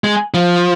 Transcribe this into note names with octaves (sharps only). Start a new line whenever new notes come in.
G#3
F3